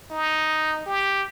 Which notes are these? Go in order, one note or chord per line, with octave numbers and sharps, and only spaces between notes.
D#4
G4